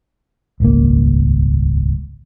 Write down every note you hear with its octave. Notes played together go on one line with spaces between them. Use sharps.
D#1 G#1 C#2 A#3